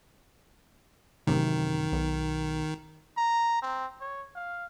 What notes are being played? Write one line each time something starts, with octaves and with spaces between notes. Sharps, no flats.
A1 F#2 C3 D#3
B1
A#5
C4
C#5
F5